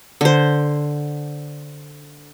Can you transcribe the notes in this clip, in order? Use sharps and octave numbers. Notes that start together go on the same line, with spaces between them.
D3 C5